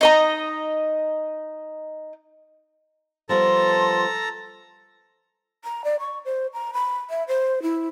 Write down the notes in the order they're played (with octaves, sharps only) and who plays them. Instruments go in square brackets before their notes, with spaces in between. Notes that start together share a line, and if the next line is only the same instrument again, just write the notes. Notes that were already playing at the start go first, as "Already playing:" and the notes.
[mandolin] D#4 D#5 A#5
[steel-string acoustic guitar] F3 G3 B3 [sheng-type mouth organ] A4 A5 A#5 [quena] C6
[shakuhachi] A#5
D5
C#6
C5
A#5
B5
E5
C5
E4